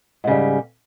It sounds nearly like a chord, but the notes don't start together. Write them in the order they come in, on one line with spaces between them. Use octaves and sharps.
G#2 C#3 G3